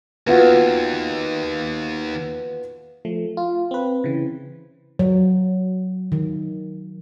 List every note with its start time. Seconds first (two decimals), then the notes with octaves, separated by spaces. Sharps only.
0.27 D#2 B3 F4 F#4
3.05 F3 A3
3.37 F4
3.71 C4 B4
4.04 C#3 E3
4.99 F#3
6.12 D#3